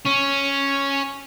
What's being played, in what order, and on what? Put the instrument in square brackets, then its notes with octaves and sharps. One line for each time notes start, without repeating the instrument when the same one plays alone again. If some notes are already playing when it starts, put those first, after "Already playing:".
[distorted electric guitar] C#4